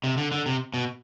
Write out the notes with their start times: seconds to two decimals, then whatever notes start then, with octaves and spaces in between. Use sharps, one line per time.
0.04 C3
0.17 D3
0.32 D3
0.46 C3
0.74 B2